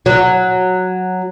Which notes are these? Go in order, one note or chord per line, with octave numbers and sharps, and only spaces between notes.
F#3